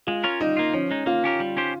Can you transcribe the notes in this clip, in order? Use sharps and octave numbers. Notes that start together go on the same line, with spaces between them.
G#3 F4
C#4 F4 A#4 C#5
G3 D#4
A#3 F4
F3 C#4
G#3 D#4
A#3 F4
C#4 G4 A#4
G3
C#4 G4 C5